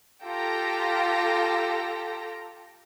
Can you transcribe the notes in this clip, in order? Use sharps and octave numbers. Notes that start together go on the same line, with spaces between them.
F4 G4 A4 G5 A#5 A#6